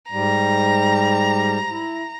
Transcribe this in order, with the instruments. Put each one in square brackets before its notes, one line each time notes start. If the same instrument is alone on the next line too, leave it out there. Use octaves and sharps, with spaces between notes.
[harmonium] G#2 G3 [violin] A#5
[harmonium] E4